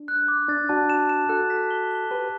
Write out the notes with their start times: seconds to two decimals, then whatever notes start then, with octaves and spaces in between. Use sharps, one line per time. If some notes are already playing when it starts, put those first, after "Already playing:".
Already playing: D4
0.08 F#6
0.28 D6
0.48 D4 A6
0.69 D4 F#4 A5
0.90 E7
1.09 E7
1.29 F#4 A4 F#6
1.50 B6
1.71 G7
1.91 G7
2.11 G4 B4 G7